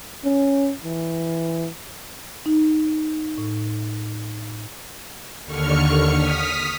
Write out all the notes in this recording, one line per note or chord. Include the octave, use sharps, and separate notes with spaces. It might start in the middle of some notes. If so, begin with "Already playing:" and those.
C#4
E3
D#4
A2
D#2 D3 C#6 F6 C#7
D#6 F6 B6